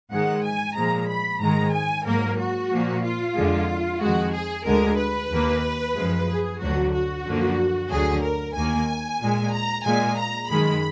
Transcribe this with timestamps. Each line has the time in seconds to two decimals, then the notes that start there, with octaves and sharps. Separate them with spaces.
0.10 G#2 D#3 G#3 F#5
0.43 G#5
0.75 A#2 F3 G#3 A#5
1.08 B5
1.40 G#2 D#3 G#3 A#5
1.72 G#5
2.05 G#2 F#3 A#3 A#4
2.37 F#4
2.70 A#2 F3 A#3
3.03 F4
3.35 F2 D3 G#3
4.00 F2 D#3 G#3 F#4
4.33 G#4
4.65 D2 D3 G#3 A#4
4.98 B4
5.30 D#2 D#3 A#3
5.95 F#2 F3 G#3
6.28 G#4
6.60 D2 D3 F#3 F#4
6.93 F#4
7.25 F#2 D3 F3 A#3
7.89 D2 D3 F#3 G#4
8.22 A#4
8.55 D#2 D#3 A#3 G#5
9.20 A#2 G#3
9.53 A#5
9.85 A#2 G#3 G#5
10.17 A#5
10.50 F#2 D#3 G#3 B5